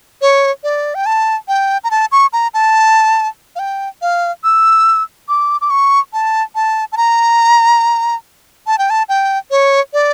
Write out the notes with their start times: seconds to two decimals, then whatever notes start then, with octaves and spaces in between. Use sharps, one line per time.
0.22 C#5
0.64 D5
0.95 G5
1.06 A5
1.48 G5
1.84 A#5
1.91 A5
2.12 C#6
2.33 A#5
2.54 A5
3.56 F5
3.59 G5
4.02 F5
4.44 E6
5.29 D6
5.61 D6
5.70 C#6
6.13 A5
6.55 A5
6.92 A5
6.97 A#5
8.67 A5
8.78 G5
8.90 A5
9.09 G5
9.51 C#5
9.93 D5